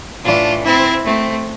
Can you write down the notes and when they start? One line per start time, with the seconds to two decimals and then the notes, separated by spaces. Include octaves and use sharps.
0.24 A2 E3 D4 F4
0.64 C4 E4
1.05 A3 C4